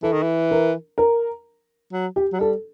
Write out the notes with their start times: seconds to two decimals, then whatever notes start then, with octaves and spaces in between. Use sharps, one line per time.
0.03 E3 A4
0.13 D#3
0.22 E3
0.51 A#4
0.98 A#4
1.92 F#3
2.16 G4
2.33 F#3
2.40 G3 A4